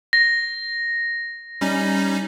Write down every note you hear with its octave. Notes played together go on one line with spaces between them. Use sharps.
A#6
G3 C#4 D#4